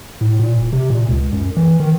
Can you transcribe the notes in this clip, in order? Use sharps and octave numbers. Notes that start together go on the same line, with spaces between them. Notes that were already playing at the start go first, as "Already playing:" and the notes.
A2
A#2
E1
C3
A#2
C#2
F#2
E3
D#3